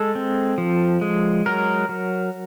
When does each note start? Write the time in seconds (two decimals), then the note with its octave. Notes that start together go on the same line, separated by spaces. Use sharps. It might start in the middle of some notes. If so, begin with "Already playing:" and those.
Already playing: G#3 A4
0.15 C4
0.58 F3
1.01 G#3
1.46 F#3 A#4
1.89 F#3